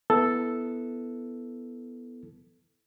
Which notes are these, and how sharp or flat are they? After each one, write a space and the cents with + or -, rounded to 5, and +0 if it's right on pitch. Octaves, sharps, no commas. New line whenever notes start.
B3 +0 E4 +0 A4 +0